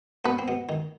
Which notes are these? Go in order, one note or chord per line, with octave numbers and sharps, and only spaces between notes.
B2 B3 B4
C4
B2 B3
D#3 D#4